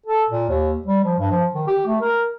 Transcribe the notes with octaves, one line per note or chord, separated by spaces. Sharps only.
A4
A#2
D#2
G3
F3
G2
F3
D#3
G4
A3
A#4